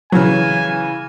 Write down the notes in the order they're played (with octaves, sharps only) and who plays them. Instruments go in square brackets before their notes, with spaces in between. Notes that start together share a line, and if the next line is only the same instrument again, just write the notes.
[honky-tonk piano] C#3 E3 [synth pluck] F#3 [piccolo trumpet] G#5